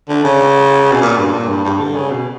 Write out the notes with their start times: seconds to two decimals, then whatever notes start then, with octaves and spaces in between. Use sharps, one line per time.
0.09 D3
0.24 C#3
0.92 B2
1.01 A#2
1.18 G2
1.33 A#2
1.48 G2
1.64 G2
1.80 D3
1.95 C#3
2.11 B2